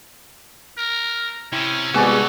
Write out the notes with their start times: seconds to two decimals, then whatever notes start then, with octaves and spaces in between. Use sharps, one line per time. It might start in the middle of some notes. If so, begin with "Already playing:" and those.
0.78 A#4
1.52 C3 C#4 E4
1.94 G2 C3 G#3 B3 F#4 G#4 A4 D5